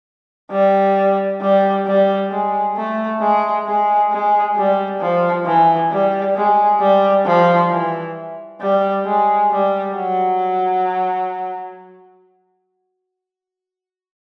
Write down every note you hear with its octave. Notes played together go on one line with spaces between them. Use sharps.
G3
G3
G3
G#3
A3
G#3
G#3
G#3
G3
F3
E3
G3
G#3
G3
F3
E3
G3
G#3
G3
F#3